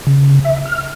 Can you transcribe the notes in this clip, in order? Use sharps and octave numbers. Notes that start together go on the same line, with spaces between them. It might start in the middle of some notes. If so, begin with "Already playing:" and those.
C#3
E5
F6